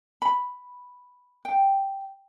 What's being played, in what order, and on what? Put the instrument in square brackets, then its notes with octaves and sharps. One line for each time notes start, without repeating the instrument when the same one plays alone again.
[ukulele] B5
G5